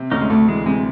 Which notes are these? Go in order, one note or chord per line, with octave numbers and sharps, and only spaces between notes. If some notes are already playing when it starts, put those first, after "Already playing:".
Already playing: C3
D2 C#4 D#4
G#3
D2 A3
E3 G#3
C3 G#3